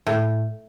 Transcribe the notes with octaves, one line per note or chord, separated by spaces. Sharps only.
A2